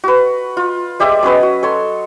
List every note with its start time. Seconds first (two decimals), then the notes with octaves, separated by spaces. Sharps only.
0.04 F#4 B4
0.57 F4
1.00 G#3 G4 D5 E5
1.23 F#3 C#4 B4 D#5
1.43 F#4
1.63 A4 C#5 C6